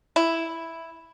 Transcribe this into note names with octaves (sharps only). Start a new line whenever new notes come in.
E4